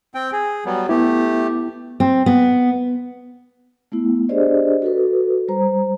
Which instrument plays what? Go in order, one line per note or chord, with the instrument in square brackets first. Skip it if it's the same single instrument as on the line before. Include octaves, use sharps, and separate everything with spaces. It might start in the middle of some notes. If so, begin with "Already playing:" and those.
[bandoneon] C4 G5
G#4
F#3 G3 B3
[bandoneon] A3 G4 [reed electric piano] B3 E4
[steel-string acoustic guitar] C4
B3
[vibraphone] A3 B3 E4
D4 G4 G#4 C5 D5 D#5
F#4 A4 B4
G3 C5 A#5